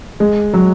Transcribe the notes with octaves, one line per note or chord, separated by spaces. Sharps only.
G#3
F#3